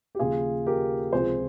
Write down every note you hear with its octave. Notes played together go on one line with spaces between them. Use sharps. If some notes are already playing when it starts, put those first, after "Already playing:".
G4
D#2 C#3 F3 F4 G#4
G4 A#4
C#2 C3 F3 G#4 C5